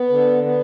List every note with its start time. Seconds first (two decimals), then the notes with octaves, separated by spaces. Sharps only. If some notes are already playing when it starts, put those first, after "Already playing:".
Already playing: B3
0.10 D3
0.44 B3